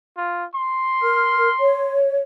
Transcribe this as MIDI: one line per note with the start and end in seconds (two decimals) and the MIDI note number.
0.17 0.45 65
0.55 1.96 84
1.03 1.49 70
1.03 1.49 89
1.59 2.20 73